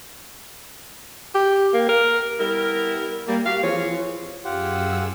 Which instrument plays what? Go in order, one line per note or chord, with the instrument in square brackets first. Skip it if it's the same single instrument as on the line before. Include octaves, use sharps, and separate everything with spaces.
[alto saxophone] G4
A#3
A#4
[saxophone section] G3 B3 E4 A#4
G3 A#3
F#4 G4 F5
E3 F3 C4 G#4 C#5
[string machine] F#2 G#4 E6 [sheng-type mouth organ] F4 G4 F#5